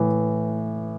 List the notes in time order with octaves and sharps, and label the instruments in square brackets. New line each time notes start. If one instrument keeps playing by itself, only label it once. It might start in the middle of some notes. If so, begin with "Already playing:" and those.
Already playing: [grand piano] A2 E3